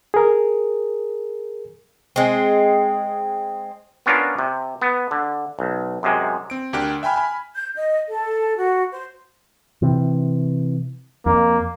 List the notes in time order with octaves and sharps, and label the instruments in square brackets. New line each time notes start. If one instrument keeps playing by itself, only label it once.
[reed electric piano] G#4 A#4
[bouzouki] G#3 C4
[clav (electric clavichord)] B3 C#4 D4 F4 A#4
C3
B3
D3
B1
F#2 C3 G#3
[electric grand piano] C4 D7
D2 D4 G4 A#4 F#6 D7
E5 G5 G#5 B5 F6
G#5 B5
[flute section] G6
D#5
A4
F#4
C5
[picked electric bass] C3 E3
[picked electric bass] F2 [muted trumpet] A#3